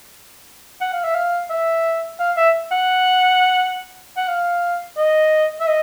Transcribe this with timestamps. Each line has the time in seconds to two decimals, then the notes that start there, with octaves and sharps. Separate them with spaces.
0.81 F#5
0.93 F5
1.04 E5
1.15 F5
1.50 E5
2.19 F5
2.37 E5
2.72 F#5
4.17 F#5
4.28 F5
4.97 D#5
5.60 E5
5.67 D#5